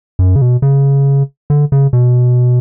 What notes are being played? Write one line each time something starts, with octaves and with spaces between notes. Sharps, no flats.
F#2
C#3
B2
C#3
D3
C#3
B2